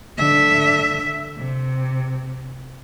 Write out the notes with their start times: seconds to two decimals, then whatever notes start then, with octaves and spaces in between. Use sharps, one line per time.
0.18 D3 E5
1.38 C3